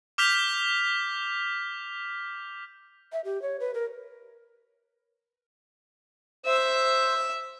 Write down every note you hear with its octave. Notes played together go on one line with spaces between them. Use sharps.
D6 F6 G6 B6 F7
E5
G4
C#5
B4
A#4
C5 E5 E6